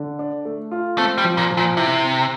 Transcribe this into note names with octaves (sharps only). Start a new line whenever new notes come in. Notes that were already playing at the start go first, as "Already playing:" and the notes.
Already playing: D3
D4
A3
F4
A3 C4
G3
F3
A#2
F3
A#2
C3 E4
C4